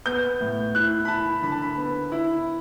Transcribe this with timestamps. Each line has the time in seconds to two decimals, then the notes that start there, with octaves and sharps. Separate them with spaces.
0.06 B3 G6
0.40 A2
0.75 E4 F#6
1.05 B5
1.08 E4 A5
1.42 D3 B5
1.52 A5
1.62 B5
1.77 B3
2.12 E4